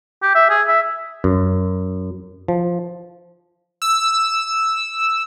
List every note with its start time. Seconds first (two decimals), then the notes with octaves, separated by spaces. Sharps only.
0.23 G4
0.35 E5
0.50 G#4
0.67 E5
1.24 F#2
2.48 F3
3.82 E6